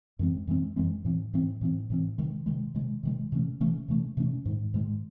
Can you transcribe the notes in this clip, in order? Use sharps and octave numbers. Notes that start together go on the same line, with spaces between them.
F#2 E3 G#3 C4
F#2 E3 G#3 C4
F#2 E3 G#3 C4
A2 E3 C4
A2 E3 C4
A2 E3 C4
A2 E3 C4
C3 D#3 G#3
C3 D#3 G#3
C3 D#3 G#3
C3 D#3 G#3
C3 E3 A3 C#4
C3 E3 A3 C#4
C3 E3 A3 C#4
C3 E3 A3 C#4
G#2 D#3 G#3
G#2 D#3 G#3